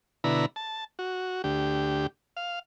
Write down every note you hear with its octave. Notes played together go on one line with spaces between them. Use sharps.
B2 D3 E4 A#5 B5
A5
F#4
D2 G4
F5